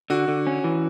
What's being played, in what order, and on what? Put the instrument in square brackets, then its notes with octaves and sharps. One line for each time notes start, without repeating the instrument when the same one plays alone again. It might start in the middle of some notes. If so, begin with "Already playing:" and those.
[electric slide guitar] D3 [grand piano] F#4
[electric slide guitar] D3
C#4
E3